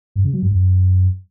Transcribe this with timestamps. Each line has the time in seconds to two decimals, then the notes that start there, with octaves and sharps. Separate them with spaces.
0.16 G2
0.24 C#3
0.33 F#3
0.42 G2
0.51 F#2